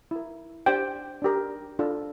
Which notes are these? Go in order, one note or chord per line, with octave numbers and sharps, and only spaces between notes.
E4 A#4
D4 G4 C5 G5
D4 G4 A#4
D4 F4 A4